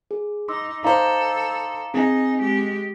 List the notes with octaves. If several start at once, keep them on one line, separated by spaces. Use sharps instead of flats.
G#4
D#4 C6 D6 E6
D#4 A4 C5 F5 A#5 D6
C4 D#4 G#4 G#5
G#3 G4